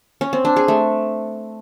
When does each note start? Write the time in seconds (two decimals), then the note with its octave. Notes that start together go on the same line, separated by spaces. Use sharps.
0.21 C#4
0.33 C4
0.45 D4
0.56 G#4
0.68 A3